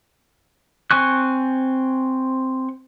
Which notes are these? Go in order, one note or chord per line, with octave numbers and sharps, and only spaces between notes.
C4 G#5 C#6 F#6